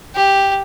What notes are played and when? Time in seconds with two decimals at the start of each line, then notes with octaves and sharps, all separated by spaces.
0.15 G4